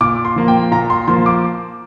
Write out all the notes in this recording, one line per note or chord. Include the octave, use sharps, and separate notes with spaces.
A#2 D6
C6
F3 A#3
G5
A#2 A#5
C6
F3 A#3 C6
D6